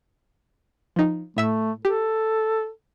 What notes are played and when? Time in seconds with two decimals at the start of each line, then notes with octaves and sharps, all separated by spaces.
0.96 F3 D#4
1.37 A2 A3 E5 E6
1.85 G4 A4